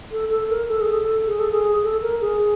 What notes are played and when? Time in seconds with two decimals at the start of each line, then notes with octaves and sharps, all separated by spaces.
0.11 A4
0.30 A4
0.49 A#4
0.68 A4
0.80 G#4
0.92 A4
1.26 G#4
1.39 A4
1.51 G#4
1.83 A4
2.02 A#4
2.21 G#4